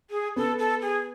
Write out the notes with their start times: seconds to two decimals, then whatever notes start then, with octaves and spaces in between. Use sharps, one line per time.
0.10 G#4
0.36 B3 A4
0.59 A4
0.82 G#4